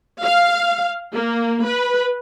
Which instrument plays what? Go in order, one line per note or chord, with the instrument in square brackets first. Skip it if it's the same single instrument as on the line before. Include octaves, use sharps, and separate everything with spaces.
[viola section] F5
A#3
B4